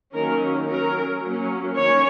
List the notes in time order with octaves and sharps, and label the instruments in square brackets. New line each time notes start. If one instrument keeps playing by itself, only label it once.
[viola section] D#3 F#3 A#3 C#4 A#4
F#3 C#4 A#4
F#3 A#3 C#4
D#3 A#3 C#4 C#5